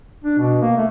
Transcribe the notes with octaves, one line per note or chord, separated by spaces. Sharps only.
D4
B2
A#3
A3